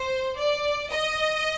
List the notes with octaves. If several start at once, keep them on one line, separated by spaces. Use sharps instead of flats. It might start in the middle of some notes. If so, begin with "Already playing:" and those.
Already playing: C5
D5
D#5